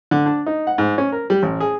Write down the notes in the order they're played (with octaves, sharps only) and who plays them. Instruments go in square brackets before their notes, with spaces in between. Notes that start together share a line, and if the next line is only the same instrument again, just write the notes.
[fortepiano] D3
D4
D#4
F#5
G#2
C#4
A#4
G3
A1
G#4